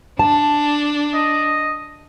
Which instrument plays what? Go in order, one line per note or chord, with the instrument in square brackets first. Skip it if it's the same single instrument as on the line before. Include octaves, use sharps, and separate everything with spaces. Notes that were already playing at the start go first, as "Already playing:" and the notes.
[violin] D4 [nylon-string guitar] A5
[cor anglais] D#5